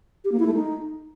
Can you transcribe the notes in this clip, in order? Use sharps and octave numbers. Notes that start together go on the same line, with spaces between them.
G4
A#3
E4
A3
D#4